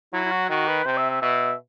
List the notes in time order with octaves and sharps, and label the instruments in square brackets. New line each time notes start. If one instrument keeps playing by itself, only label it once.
[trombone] F#3 [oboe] E4
[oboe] E4
F#4
[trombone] D#3 [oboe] F#4
[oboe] B4
[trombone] C3 [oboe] C5
[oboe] E5
E5
[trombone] B2 [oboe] E5